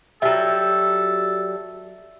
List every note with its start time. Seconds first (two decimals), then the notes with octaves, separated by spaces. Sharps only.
0.22 F#3 G3 A4 E5